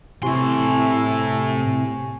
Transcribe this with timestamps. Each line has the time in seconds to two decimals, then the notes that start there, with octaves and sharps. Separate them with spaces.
0.23 A2 C3 E4 G#5 C6 C#6